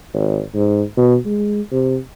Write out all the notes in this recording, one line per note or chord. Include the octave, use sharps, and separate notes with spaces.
G#1
G#2
B2
G#3
C3